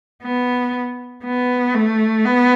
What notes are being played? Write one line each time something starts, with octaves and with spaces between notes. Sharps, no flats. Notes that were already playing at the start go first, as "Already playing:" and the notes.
B3
B3
A3
B3